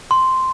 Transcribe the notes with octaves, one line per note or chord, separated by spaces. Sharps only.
C6